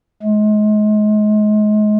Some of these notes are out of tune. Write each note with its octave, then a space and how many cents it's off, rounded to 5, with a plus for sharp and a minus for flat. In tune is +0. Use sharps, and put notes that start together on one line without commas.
G#3 +35